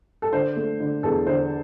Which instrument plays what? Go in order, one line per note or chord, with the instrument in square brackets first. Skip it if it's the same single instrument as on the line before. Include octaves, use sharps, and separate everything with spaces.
[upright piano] A4
D3 C5
A3
D3
E2 A4
D3 C5